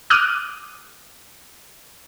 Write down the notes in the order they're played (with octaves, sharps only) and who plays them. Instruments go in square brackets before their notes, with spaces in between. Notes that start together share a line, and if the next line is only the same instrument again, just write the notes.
[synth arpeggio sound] D6 D#6 F6 F#6 D#7